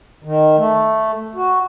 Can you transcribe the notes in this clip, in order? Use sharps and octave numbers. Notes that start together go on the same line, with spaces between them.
D#3
A3
F#4